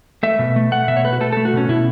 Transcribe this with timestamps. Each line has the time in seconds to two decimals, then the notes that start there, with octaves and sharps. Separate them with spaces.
0.23 A3 E5
0.39 B2
0.56 A3
0.71 A3 F#5
0.88 B2 E5
0.97 C#5
1.04 A3 B4
1.13 F#4
1.20 A3 A4
1.32 A3 A4
1.45 F#4
1.53 B2 C#4
1.69 B2 E4